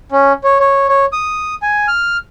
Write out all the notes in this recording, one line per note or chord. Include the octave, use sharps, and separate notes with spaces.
C#4
C#5
C#5
C#5
D#6
G#5
F6